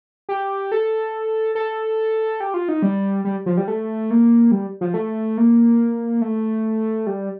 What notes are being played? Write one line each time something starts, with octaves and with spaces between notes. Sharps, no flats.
G4
A4
A4
G4
F4
D#4
G3
G3
F3
G3
A3
A#3
G3
F3
A3
A#3
A3
G3